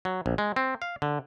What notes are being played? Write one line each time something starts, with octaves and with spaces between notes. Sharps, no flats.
F#3
A#1
G#3
C4
F5
D3